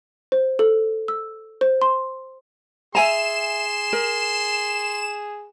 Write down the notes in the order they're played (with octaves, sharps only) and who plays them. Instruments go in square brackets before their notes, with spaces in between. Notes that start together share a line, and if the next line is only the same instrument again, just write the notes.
[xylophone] C5
A4
E6
C5
C6
[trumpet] G#4 [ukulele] E5 G#5 A#5 [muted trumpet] C6 [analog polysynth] E7
[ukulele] A#4